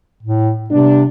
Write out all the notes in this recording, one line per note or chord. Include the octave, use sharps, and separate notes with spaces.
A2
C3 G3 B3 D4